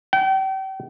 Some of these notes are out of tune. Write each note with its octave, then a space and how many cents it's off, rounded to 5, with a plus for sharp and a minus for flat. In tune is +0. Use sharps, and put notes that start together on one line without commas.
G5 -35